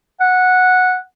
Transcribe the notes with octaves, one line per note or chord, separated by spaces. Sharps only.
F#5